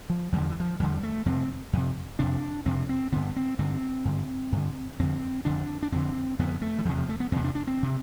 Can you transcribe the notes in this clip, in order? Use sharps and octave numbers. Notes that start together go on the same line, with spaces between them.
F3
E2 D3 G3
F3
E3
F3
E2 D3 G3
A3
F2 C3 C4
F2 C3
F2 C3 D4
F2 C3 C4
C4
G2 D3 B3
C4
G2 D3 C4
G2 D3
G2 D3
F2 D3 C4
F2 D3 D4
D4
F2 D3 C4
F2 D3 B3
A3
E3
E2 C3 F3
F3
A3
B3
E2 C3 C4
D4
D4
C4
C3